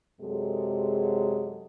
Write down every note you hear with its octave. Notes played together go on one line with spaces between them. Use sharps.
F#2 C3 F#3 G#3 G#4 A4